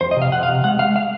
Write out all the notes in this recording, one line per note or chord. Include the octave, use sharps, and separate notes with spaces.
F2 C5
D#5
C3
F5
F2 F#5
F5
C3
G#3 F#5
G#3 F5
F5